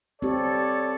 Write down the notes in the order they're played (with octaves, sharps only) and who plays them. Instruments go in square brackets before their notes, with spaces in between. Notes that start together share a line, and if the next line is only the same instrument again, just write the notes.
[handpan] C4 G4 [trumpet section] A4 C#5 D5